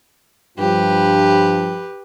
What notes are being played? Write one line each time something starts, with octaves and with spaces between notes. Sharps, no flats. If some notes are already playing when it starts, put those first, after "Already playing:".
G2 F3 G4 B4